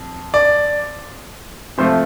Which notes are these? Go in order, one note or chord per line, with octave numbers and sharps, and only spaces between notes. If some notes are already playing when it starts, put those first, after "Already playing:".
Already playing: F2
D5
C3 F3 A3 C5